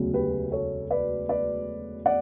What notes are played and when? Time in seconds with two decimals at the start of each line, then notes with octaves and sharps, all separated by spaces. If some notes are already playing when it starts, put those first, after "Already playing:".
Already playing: E1 D2 C#3 F#3
0.14 G4 B4
0.52 A4 C#5
0.90 B4 D5
1.29 B4 D5
2.06 D5 F#5